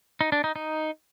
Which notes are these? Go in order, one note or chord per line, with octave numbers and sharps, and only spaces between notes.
D#4
D4
D#4
D#4